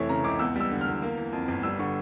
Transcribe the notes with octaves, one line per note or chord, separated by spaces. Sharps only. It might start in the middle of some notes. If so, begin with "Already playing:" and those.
Already playing: F1 E3 A3 C#5 E5
C#3 A#5
C#2 D6
E2 E6
G3 E6
D3
F6
E2
A#3
E3
F2
G1
G3 E6
D3 C#6